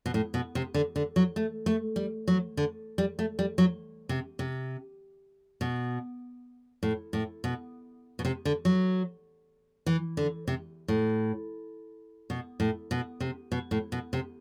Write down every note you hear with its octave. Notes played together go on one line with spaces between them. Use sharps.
B2
A2
B2
C3
D3
D3
F#3
A3
A3
G3
F#3
D3
G3
A3
G3
F#3
C3
C3
B2
A2
A2
B2
B2
C3
D3
F#3
E3
D3
C3
A2
B2
A2
B2
C3
B2
A2
B2
C3